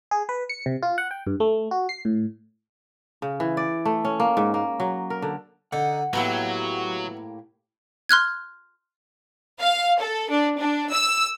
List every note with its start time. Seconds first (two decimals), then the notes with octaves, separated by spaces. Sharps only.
0.11 G#4
0.29 B4
0.49 C#7
0.66 C3
0.83 F4
0.98 F#5
1.11 G5
1.27 G2
1.40 A3
1.71 F#4
1.89 C7
2.05 A2
3.22 C#3
3.40 E3
3.57 D5
3.85 A3
4.05 C#4
4.20 A#3
4.37 G#2
4.54 A#3
4.80 F#3
5.10 A#4
5.22 D3
5.73 D3 D#4 F#5
6.13 A2 F#3 A#3 B3 E4 G4
8.09 C6 F6 F#6 G#6
9.60 F5
10.00 A4
10.29 D4
10.59 D4
10.92 E6